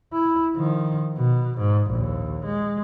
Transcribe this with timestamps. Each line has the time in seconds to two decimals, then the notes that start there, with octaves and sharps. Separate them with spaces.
0.13 E4
0.56 D#3 F3
1.17 B2
1.58 G#2
1.91 A#1 D#2
2.45 G#3